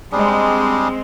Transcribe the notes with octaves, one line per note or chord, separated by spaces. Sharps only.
G3 G#3 C4 D4 G#4